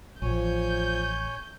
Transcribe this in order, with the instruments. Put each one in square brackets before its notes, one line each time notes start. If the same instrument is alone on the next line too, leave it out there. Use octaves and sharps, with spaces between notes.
[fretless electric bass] A1 [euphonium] F3 [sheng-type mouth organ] C#5 G#5 [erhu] G6